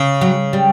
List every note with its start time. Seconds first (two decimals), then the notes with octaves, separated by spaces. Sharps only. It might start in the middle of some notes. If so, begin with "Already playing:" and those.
Already playing: C#3
0.21 F#3
0.53 G3